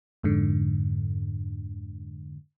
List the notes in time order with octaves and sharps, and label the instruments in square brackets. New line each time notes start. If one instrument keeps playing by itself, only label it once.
[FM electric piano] F2 G#2 D3